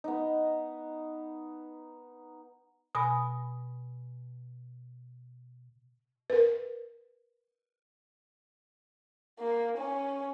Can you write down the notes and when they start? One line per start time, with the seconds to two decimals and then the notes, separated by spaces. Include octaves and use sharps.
0.04 B3 D#4
2.95 B2 G#5 B5 D#6 A#6
6.30 A#4 B4
9.39 A#3
9.78 C#4